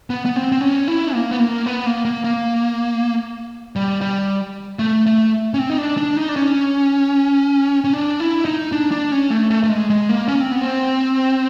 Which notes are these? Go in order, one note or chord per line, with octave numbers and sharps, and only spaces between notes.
B3
B3
C4
C4
C#4
E4
A#3
B3
A#3
B3
A#3
A#3
A#3
G3
G3
A3
A3
C#4
C4
D#4
D4
D4
D#4
D4
C#4
C#4
D4
E4
D#4
D4
D4
C#4
A3
A3
A3
G#3
G#3
A#3
C#4
C4
B3
C4